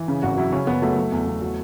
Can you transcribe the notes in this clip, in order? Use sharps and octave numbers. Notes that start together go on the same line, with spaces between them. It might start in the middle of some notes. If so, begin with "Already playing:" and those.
Already playing: E3
C#3
G#1 F#4
F#3 E4
C#3 C#4
F#1 B3
F#3 A3
F#3
E2
E2
F#3